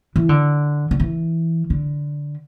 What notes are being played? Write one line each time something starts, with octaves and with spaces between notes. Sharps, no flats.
E3
D3
D3
E3
D3